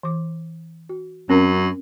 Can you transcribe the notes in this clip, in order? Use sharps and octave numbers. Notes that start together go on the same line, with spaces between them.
E3 D6
F#4
F#2 C4 C#4 A#4